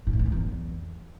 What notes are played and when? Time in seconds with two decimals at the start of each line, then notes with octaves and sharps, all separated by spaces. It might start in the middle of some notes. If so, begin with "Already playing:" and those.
0.07 A#2
0.13 A2
0.19 E2
0.26 F#2
0.32 E2